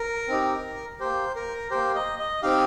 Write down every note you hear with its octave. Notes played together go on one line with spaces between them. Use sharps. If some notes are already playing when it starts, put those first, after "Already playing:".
Already playing: A#4
C4 D#4 G4
A#3 G4 C5
A#4
A#3 G4 C5
D#5
D#5
C4 D#4 G4 F5